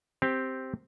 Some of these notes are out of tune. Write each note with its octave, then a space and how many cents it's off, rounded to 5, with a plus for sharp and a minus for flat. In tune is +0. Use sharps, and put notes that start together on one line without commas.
C4 +0 G4 +0